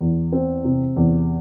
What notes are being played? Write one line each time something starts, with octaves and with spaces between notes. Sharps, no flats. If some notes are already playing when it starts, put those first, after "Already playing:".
E2
C4
C3
E2